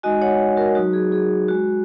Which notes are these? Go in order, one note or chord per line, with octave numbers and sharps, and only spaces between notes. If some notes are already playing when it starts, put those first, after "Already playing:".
G#3 D#4 F#4 D#5 G#5
C#5 F#5
F#4 A#4
F#3 D#4 F#4
G#4
G#4
G#3 F#4